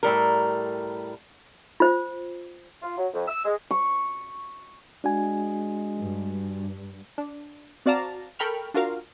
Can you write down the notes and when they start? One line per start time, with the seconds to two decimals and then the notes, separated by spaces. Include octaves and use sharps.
0.03 A2 G3 A#4
1.80 F4 C5
2.81 F4
2.97 F#3
3.13 F2
3.27 E6
3.44 G#3
3.71 C#6
5.04 G#3 D4 F#4 G#5
5.98 G2
7.18 D4
7.86 C4 F#4 D5 F5 A5 A#5
8.39 A4 A#4 G5 B5 C#6 F6
8.74 D4 F4 F#4 A#4 F5